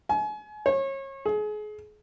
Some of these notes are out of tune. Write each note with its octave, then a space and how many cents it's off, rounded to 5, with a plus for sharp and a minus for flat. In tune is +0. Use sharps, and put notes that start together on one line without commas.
G#5 +35
C#5 -30
G#4 +30